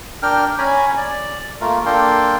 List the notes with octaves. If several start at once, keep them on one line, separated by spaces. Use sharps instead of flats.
D4 A#4 G5 F6
C#4 G#5 A#5 B5
D5
A3 A#3 F4 A#4
A#3 D4 A4 A#4 G5 C6